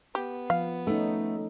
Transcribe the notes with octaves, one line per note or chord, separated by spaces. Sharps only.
B3 G4
F3 F5
A3 C#4 D#4